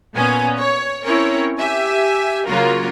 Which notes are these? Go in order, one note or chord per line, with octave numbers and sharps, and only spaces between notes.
A#2 B3 C#4 G#5
C#5
C4 C#4 E4 A#4 C#5
G4 E5 G#5
C#3 F#3 A#3 F4 F#4 A#4